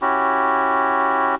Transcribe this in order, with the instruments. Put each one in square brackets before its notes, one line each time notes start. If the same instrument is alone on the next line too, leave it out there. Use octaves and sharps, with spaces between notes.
[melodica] C#4 E4 F#4 G4